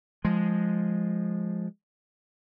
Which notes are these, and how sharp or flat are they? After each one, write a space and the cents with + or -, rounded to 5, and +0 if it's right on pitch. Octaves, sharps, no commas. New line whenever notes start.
F3 +0 G#3 +0